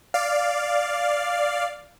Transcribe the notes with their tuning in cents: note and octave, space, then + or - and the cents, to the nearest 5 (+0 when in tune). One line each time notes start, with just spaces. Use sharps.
D5 +0 F5 +0